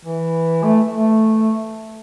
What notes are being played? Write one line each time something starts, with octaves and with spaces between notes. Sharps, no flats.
E3
A3
A3